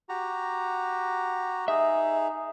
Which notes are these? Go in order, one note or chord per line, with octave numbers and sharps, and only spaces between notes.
F#4 G4 A#5
D#4 G#4 E5